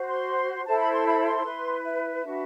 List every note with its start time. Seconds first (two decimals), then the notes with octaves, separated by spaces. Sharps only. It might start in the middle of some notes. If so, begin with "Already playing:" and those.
Already playing: F#4 C5
0.08 C6
0.67 E4 A4 C5 A5
0.79 B5
0.93 C6
1.06 B5
1.26 C6
1.45 E4 B4
1.85 E5
2.24 D4 F#4 B4